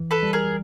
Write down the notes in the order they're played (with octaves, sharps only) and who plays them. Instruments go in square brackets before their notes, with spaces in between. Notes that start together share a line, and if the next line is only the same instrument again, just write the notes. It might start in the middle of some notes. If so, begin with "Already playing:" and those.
Already playing: [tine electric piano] E3
[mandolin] A4 B4
[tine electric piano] G3
[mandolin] G#4 A#4